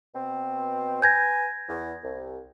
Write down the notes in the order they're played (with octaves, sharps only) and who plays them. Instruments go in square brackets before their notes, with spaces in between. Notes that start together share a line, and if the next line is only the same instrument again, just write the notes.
[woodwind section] B2 C4
[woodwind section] B4 G#5 [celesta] G6 G#6 A#6
[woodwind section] E2
C2